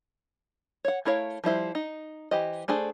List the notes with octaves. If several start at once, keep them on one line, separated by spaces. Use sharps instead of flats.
C#5 F#5
A3 E4 A#4 C#5 F5
F3 G3 E4 C5
D#4
E3 G4 C5 D#5
A3 D4 G#4 A4 C5